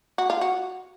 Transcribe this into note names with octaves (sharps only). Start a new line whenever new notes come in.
F#4
F4
F#4